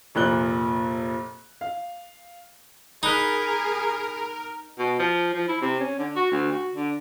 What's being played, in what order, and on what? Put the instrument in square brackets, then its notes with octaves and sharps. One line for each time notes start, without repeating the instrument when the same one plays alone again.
[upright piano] F1 A#2 F#6 G7
F5
[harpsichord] D#4 [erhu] G#4 [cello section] A#4 [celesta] B5 F#6 B6
[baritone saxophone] B2
F3
F3
E4
C3
C#4
D3
F#4
D2
F#4
D3